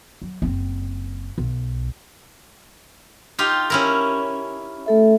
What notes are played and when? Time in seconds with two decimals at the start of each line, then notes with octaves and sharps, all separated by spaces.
0.22 F#3
0.42 F#1 C4
1.38 B1
3.38 D#4 F4 G4
3.70 C#4 E4 A#4
4.86 A3 A4 E5